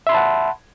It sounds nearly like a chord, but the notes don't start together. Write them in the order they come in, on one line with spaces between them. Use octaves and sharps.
E5 C6 B5 A5 F#5